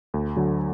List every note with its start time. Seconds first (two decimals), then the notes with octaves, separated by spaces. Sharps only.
0.14 D2
0.36 D3 F#3